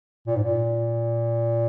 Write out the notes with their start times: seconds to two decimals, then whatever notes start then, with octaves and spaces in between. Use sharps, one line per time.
0.27 A#2
0.36 G#2
0.43 A#2